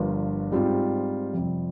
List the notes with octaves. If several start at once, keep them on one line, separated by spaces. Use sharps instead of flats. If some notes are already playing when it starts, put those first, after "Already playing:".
Already playing: G1 G2 F3 A#3 F4
G#2 G3 C4 F4
F2 C3 G3